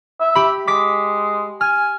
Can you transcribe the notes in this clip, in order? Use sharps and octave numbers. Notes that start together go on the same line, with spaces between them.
E5
G4 B5
G#3 D6 B6
G#5 F6